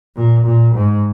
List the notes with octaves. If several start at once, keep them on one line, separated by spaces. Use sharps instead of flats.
A#2
A#2
G#2